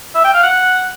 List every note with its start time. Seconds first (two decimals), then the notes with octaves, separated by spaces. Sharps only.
0.15 E5
0.24 G5
0.33 F5
0.43 F#5